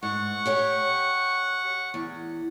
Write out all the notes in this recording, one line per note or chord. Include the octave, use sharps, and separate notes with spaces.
G#2 F#5 C#6
G4 C#5 G5
E2